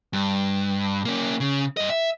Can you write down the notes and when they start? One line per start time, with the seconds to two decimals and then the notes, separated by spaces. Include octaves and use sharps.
0.13 G2
1.05 A#3 C#4
1.40 C#3
1.77 G2 D#5
1.90 E5